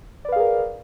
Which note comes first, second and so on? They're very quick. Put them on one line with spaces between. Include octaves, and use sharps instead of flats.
D5 B4 F5 G#4 A#4